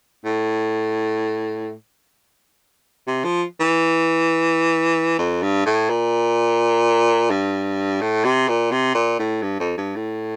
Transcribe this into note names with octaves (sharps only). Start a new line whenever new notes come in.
A2
C3
F3
E3
F2
G2
A2
A#2
G2
A2
C3
A#2
C3
A#2
A2
G2
F2
G2
A2